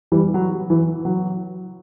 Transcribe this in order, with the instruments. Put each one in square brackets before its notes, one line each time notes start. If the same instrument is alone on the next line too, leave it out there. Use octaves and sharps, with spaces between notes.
[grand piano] E3 G3
F#3
E3
F#3